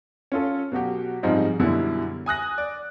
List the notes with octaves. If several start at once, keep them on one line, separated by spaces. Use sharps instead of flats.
C#4 F4 A4
B2 F#3 F#4 G4
G#2 F3 G3 G#3 C4 D#4
F#2 B2 D3 G3 E4
G#5 D#6 F#6 A#6
D5